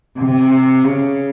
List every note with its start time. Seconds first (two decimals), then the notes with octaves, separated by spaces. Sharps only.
0.20 C3
0.84 C#3